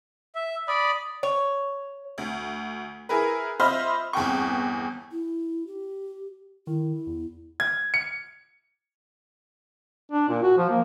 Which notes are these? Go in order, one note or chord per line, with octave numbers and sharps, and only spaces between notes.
E5
D5 B5 D#6
C#5
D2
E4 G#4 A#4 B4
F4 C5 D#5 E5 B5 F6
G1 E2 C4 G5 C#6
E4
G4
D#3 E4
E2
G#6
C#7
D4
A#2
F#4
F3
A#3